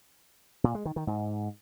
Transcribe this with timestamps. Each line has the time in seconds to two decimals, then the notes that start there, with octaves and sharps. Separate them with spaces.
0.64 A#2
0.75 G#3
0.85 D#3
0.96 D#3
1.07 G#2